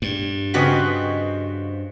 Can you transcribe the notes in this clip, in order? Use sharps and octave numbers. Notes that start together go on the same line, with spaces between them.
G2
C#3 C4 F#4 B4 D5 D#5